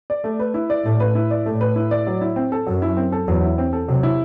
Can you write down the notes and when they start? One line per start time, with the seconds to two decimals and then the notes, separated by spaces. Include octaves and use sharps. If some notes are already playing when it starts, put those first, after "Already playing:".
0.10 D5
0.24 A3
0.39 B4
0.54 E4
0.70 D5
0.85 A2 A3
1.00 B4
1.15 E4
1.31 D5
1.46 A2 A3
1.61 B4
1.76 E4
1.91 D5
2.07 F#3
2.21 E4
2.36 C4
2.52 A4
2.67 F#2 F#3
2.82 E4
2.97 C4
3.12 A4
3.28 E2 F#3
3.42 E4
3.58 C4
3.73 A4
3.88 C3 F#3
4.03 E4